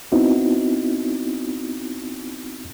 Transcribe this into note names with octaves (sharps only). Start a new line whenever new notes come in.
B3 C4 D#4 E4 F#4